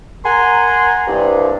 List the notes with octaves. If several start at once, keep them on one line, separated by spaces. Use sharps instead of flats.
A#4 F#5 G#5 A#5 C6
C2 G2